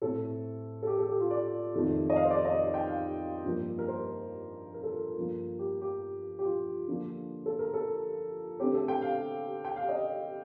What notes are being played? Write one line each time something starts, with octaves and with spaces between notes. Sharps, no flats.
A2 A3 C4 A4
A4
G4
A4
G4
F4
D5
F2 D#3 A3
D#5
F5
C5
D5
D#5
G5
F5
G2 F3 A#3
A#4
C5
A#4
A4
A#4
G2 F3 A#3
G4
G4
G4
F4
D3 F3 A#3
A4
A#4
A4
D3 A3 C4 G4
A4
G5
F5
G5
F5
D#5